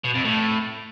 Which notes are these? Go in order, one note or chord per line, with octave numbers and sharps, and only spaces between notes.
B2
F2
A2